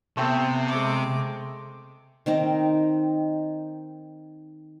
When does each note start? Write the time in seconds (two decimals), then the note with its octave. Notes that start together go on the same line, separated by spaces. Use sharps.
0.17 C3 A3 B3 C4 C5
0.69 G#3 D6
2.26 D#3 C4 D#4